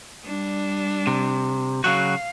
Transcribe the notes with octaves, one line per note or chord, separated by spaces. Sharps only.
G3 D4
C3
C#3 F#3 F#4 F5